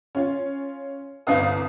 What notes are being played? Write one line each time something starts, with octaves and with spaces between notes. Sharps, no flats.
C#4 F4
G1 C2 D4 B4 F5 D#6